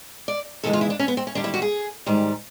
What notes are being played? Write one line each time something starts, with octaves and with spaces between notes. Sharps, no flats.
D5
D#2 C#3 E3 G#3 A4
F4
E4
D4
C#4
B3
C4
C#4
D#2 D3 G3 D4
E4
F#4
G#4
G#2 D#3 G3